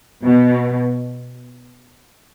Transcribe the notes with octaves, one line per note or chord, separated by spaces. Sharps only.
B2